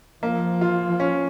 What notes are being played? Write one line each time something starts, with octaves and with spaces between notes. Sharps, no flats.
F3 A#3
F4
C#4